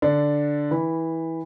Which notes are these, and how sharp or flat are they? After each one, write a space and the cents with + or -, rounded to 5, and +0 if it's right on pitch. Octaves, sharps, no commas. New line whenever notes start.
D3 +0 D4 +0
E3 -20 B5 +0